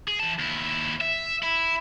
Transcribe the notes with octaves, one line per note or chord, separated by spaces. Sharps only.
G#4
E3 A5
D#2 E4
E5
E4